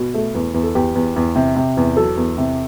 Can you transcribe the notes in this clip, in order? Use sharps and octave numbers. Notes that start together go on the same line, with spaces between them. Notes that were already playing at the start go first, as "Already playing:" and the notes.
Already playing: B2
A3
E2
E2
A4
E2 G4
E2
E2
C3
C3
E2
F#3 A4
E2
C3